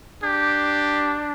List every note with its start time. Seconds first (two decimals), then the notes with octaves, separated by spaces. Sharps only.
0.23 D4 G4